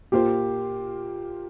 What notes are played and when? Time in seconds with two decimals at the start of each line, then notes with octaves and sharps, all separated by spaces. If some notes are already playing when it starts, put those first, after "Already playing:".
0.12 A#2 A#3 F4 G4 C5